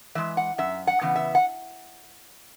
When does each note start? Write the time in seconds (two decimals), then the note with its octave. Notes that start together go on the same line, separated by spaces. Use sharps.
0.15 E3 G#3 E5
0.37 F#5
0.58 F#2 E5
0.87 F#5
1.01 C#3 E3 B3
1.16 E5
1.35 F#5